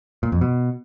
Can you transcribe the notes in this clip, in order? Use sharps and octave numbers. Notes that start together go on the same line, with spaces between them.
A#2
F2
B2